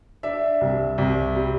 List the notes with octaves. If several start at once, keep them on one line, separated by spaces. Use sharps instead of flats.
D4 E5
C2
C2
G3